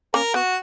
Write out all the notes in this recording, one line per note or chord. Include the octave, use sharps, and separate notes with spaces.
A#3 C#4 A#4
B3 F#4